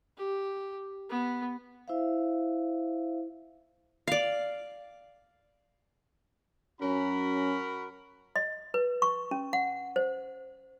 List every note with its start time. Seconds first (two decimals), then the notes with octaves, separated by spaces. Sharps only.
0.17 G4
1.10 B3
1.88 E4 C5 E5 F5
4.07 D5 F5
6.81 F#2 C#4 F#4 A#4 B5
8.36 D#5
8.74 B4
9.02 C#6
9.31 C#4
9.53 F#5
9.96 C5